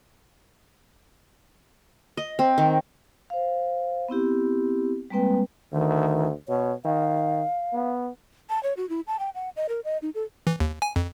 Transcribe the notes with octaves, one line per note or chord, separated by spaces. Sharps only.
D#5
C4
D#3
C5 F5
B3 C4 E4 G4
G3 G#3 A#3 C4 B4 G5
D2 D#3
B2 C#5
D#3 F5
B3
A5
C#5
F#4
E4
A5
G5
F#5
D#5
A#4
D#5
D#4
A4
E3
D#2
G#5
F2